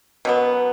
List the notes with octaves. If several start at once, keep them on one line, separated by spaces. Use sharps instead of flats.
B2 F#3 B3